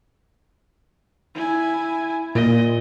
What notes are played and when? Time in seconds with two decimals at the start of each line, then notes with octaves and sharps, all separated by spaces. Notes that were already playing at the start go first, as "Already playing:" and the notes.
1.35 E4 G#5
2.35 A#2 D#5